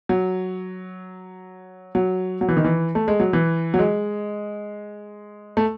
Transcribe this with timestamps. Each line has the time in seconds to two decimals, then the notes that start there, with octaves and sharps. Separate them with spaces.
0.09 F#3
1.95 F#3
2.41 F#3
2.49 E3
2.57 D#3
2.64 E3
2.95 A3
3.08 G#3
3.20 F#3
3.33 E3
3.74 F#3
3.79 G#3
5.57 A3